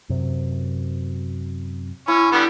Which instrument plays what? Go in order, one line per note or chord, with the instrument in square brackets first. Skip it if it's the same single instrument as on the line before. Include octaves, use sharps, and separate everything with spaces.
[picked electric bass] F#2 C3
[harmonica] C#4 [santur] E4
[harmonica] D3 G3 B3